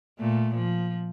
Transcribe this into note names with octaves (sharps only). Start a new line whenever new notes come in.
A#2 A3
F3